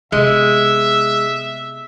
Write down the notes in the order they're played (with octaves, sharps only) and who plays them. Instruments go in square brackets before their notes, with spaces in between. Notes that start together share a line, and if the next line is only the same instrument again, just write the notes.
[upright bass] C3 B3 [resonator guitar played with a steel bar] G#3 [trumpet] E5